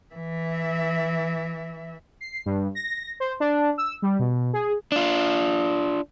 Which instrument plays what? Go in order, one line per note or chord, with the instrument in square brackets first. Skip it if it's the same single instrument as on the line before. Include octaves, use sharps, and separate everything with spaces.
[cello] E3 E5
[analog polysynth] C7
G2
A#6
C5
D4
E6
G3
B2
G#4
[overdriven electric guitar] D4 F4